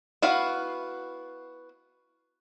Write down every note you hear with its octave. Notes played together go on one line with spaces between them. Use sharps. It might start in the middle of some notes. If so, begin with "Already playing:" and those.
B3 E4 F#4 F5